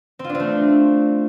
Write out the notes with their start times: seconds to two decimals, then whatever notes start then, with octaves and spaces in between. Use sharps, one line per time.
0.19 C4
0.24 F4
0.29 D4
0.35 C4
0.40 A3